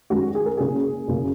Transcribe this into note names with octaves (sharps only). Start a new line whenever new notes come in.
F#2 D#3 G#3 C#4 F#4
G#4
A#4
F#1 F#2 C#3 A#3 C#4 G#4
F#1 F#2 C#3 A#3 C#4